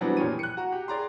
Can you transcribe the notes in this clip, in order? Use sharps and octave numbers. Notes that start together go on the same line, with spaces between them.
E3 F#3 G3 B3 C4 D4
E2 A#2 F3 G4 C#5 D#7
F#6 C#7
F#4 A#5
G4
G#4 D5 A#5 C6